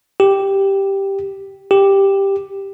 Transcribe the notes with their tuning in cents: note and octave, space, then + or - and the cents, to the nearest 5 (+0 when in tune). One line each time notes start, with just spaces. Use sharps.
G4 +0
G4 +5